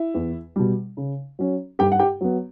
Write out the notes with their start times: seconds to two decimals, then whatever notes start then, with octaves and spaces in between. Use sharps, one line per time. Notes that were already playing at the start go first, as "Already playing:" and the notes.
Already playing: E4 E5
0.14 E2
0.56 B2 G3
0.97 C#3
1.39 F#3 C#4
1.79 G2 G4 G5
1.92 F#5
1.99 G4 G5
2.21 F#3 B3